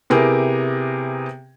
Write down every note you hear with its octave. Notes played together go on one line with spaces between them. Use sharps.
C3 B3 E4 G4 G#4 A#4